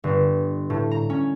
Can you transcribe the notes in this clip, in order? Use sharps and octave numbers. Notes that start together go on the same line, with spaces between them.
G1
A2
A#5
C#4